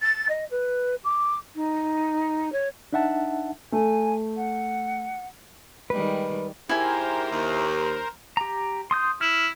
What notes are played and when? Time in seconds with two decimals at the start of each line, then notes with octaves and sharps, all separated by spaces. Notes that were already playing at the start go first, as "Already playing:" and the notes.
0.01 A6
0.29 D#5
0.50 B4
1.04 D6
1.55 D#4
2.52 C#5
2.93 D4 D#4 E5 F#5 A5
3.72 A3 G#5
4.37 F#5
5.90 D#3 G3 G#3 B4
6.69 G#2 E4 G4 A#4 C5 G#5
7.31 D#2
8.37 G4 A#5
8.91 C6 D#6 G6
9.21 E4 F6